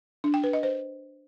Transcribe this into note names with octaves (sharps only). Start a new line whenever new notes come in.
D4
G5
B4
D#5
C5